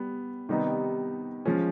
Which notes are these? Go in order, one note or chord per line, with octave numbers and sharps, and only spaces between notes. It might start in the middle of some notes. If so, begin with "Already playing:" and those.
Already playing: G3 B3
C3 D#3 G3 B3 D#4
F3 G#3 C#4 F4